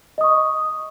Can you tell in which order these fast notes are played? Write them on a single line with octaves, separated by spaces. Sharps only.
D#5 D#6 C#6